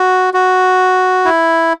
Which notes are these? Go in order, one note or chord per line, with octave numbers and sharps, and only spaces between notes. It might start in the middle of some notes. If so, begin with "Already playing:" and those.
Already playing: F#4
F#4
E4